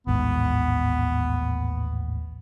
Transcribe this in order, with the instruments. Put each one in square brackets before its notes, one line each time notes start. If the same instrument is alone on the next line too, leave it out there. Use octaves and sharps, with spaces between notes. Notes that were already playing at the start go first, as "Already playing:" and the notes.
[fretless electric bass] A1 D#2 G#2 [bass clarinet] B3